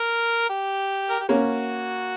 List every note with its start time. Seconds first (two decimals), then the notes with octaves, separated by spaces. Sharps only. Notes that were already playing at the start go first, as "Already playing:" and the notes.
Already playing: A#4
0.49 G4
1.09 A#4
1.20 G4
1.28 A#3 C#4 F#4